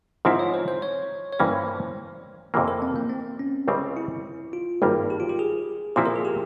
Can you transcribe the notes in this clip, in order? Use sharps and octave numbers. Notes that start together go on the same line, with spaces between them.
G#2 F3 C4 E4 C5
C#5
C5
C5
C#5
C#5
G2 E3 A#3 C#4 C5
F2 C3 E3 A#3
A#4
C4
A#3
C4
C#4
C#2 C#3 G3 C4
E4
F4
G#1 G2 G3 A#3
G4
F4
G4
G#4
A#2 F3 C4 E4 G4
A#4
G#4
G4